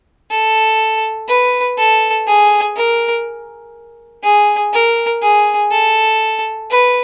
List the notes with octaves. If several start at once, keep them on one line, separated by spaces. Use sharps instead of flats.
A4
B4
A4
G#4
A#4
G#4
A#4
G#4
A4
B4